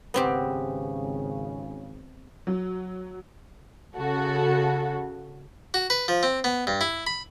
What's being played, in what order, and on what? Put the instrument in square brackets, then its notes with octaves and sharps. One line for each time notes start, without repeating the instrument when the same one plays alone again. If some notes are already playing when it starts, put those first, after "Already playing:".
[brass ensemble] G#1 C#3 [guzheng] B3 C4 G4
[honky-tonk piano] F#3
[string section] C#3 F#4 A4
[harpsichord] F#4
B4
F3
C4
B3
G2
E4
B5